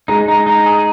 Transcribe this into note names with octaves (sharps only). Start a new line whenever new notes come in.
G#3 D#4
D#4
D#4
G#4